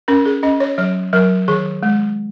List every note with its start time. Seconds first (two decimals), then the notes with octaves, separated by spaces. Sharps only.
0.08 C#4 A#4
0.25 G#4
0.43 C#4 D#5
0.60 C#5
0.78 F#3 C#5
1.13 F#3 A#4
1.48 D#3 G#4
1.83 G#3